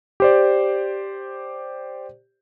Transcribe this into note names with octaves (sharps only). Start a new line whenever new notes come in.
G4 C5 D5